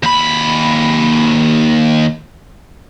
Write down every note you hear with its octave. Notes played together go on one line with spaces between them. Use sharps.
D#2 B5